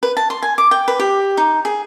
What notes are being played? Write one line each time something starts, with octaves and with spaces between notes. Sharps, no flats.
B4
A5
C6
G#5
D6
G5
B4
G4
D#4
G#4